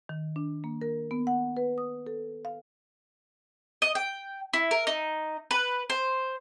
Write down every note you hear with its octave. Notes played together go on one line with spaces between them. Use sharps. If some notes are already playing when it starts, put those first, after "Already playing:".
D#3
D4
A#3
A#4
B3
F#5
B4
D#6
A4
F5
D#5
G5
E4
A#4
D#4
B4
C5